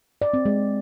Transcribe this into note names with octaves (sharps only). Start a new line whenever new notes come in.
D5
C4
G#3